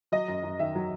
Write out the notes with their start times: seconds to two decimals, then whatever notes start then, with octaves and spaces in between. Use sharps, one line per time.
0.12 F#3 D#5
0.28 F#2
0.43 F#2
0.59 D#3 E5
0.75 F#3